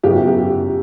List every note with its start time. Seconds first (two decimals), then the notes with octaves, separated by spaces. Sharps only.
0.03 F#2 C#3 F#3 B3 E4 G4
0.27 G4